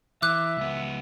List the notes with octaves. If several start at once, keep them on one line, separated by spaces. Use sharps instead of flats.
E3 E5 D6 F#6
C#2 B3